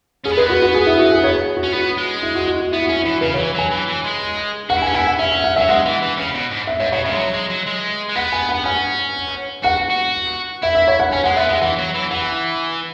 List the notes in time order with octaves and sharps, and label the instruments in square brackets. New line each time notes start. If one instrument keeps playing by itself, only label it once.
[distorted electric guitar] C#4 [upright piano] G#4
[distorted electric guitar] B3
[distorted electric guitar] G#3 [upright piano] B4
[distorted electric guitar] B3 [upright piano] F#4
[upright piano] F#4
G#4
E4
F#4
G#4
C#5
F#4
[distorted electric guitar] C#4
[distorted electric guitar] B3 [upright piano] F#4
[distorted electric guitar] G#3
[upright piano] E4
F#4
F#4
F#4
[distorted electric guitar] B3 [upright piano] E4
[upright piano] F#4
[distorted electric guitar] C#4
[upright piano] E4
[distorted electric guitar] E3
[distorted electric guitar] C#3 [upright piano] B4
[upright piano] C#5
[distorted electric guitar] E3
[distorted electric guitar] F#3 [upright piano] G#5
[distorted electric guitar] E3
E3
G#3
[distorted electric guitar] F#4 [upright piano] F#5
[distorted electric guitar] E4
[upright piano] G#5
[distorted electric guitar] C#4
[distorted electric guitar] E4 [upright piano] G#5
[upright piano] F#5
[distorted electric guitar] C#4 [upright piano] E5
[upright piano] E5
F#5
[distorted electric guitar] F#3 [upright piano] E5
[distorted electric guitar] G#3 [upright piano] F#5
[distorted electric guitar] E3
E3
C#3
B2
G#2
[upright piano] E5
[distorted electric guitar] G#2 [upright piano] C#5
[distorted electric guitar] B2 [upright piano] C#5
[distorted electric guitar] C#3 [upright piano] E5
[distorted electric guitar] G#3
F#3
G#3
F#3
G#3
G#3
[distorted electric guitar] B3 [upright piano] F#5
[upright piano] G#5
F#5
[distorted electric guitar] B3
[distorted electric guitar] C#4 [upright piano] G#5
[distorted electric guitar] F#4 [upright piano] F#5
[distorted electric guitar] F#4
[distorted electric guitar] E4 [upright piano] E5
[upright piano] E5
C#5
F#5
[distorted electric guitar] C#4 [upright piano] G#5
[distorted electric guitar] G#3 [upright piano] F#5
[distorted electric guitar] B3 [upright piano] E5
[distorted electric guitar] G#3 [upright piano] E5
[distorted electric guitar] E3 [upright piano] F#5
[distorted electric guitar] F#3
E3
[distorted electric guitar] E3 [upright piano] F#5